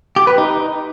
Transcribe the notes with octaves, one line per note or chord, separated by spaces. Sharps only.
G4
B4
D#4